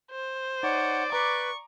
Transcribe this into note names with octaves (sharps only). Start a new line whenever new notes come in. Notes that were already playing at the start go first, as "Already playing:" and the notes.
C5
D#4 C#5 D5 F#5
B4 A#5 C#6 D6